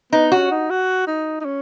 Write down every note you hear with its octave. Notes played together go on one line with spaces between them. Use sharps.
B3 D#4
C#4 F#4
D#4
F#4
D#4
D#4
C#4